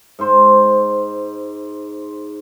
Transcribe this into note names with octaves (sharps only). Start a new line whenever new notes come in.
G#2 C5